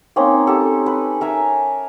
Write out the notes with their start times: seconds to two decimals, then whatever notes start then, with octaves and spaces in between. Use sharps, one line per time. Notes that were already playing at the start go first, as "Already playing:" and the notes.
0.16 A#3 C4 C#4 D#4
0.47 G4 A4
0.86 B4
1.21 A#4 E5 G#5